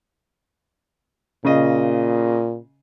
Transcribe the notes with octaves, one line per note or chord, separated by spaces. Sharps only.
A#2 C#3 D#5